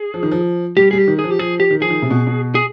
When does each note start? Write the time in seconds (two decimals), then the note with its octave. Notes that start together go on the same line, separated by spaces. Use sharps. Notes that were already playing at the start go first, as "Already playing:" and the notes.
Already playing: G#4
0.14 F3
0.23 D#3
0.32 F3
0.77 G3 G4
0.91 G3 G#4
0.98 G4
1.08 D#3
1.19 G#4
1.24 F3
1.30 G4
1.39 F3 G#4
1.60 G4
1.71 D#3
1.81 F3 G#4
1.90 D#3
2.02 C3
2.10 B2
2.27 B2
2.55 G#4